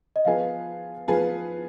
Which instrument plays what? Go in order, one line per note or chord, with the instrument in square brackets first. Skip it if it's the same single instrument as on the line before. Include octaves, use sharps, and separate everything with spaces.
[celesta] D#5
[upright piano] F3 B3 F4 G#4 B4 [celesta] F5
[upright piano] F3 B3 F4 G#4 B4